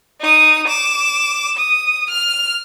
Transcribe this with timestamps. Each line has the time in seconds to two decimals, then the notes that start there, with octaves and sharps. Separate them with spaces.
0.20 D#4 D#6
0.68 D6 E7
1.57 D#6
2.10 F6